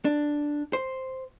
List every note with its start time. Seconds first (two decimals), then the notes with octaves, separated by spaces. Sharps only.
0.05 D4
0.73 C5